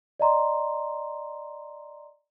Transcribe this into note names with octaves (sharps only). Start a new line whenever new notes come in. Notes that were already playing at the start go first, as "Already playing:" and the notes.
D5 D#5 A#5 C6